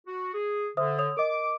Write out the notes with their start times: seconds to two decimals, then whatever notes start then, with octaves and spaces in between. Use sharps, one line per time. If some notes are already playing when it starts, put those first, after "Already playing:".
0.07 F#4
0.33 G#4
0.77 D3 C5 E5 D#6
0.98 C#5 D#6 F7
1.17 A#4 D#5 D6